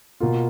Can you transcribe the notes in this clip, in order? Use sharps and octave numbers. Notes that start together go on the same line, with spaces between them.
B2 A#3 F4